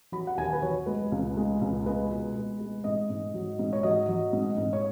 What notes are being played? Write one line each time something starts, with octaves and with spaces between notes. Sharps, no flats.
F#3 B5
F#5
D#2 G#5
B4
F#3 C#5
G#3 B4
C#2
G#3
C#2
G#3 B4
B2
G#3
G#3
G#2 D#5
G#2
F#3
G#2
C#5
F#3 D#5
F#3
G#2
G#2
C#5